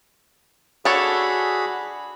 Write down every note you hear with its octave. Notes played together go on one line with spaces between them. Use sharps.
D4 F#4 G#4 A4 C#5 B5